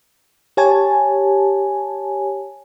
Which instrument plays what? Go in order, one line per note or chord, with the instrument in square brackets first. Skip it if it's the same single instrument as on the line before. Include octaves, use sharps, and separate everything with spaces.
[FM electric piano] G4 C#5 G#5 A5